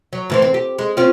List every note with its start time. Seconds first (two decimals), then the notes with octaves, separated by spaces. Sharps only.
0.13 F#3
0.30 A2 E3 C4
0.42 C4
0.54 G4
0.78 G#3
0.97 C4 C#4 F4